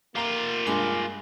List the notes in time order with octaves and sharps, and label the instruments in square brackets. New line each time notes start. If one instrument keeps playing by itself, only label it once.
[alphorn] A#3 [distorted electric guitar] F4 G4 [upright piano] F5 A#5 D6
[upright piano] G2 G#3 [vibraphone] G#5 C6 D6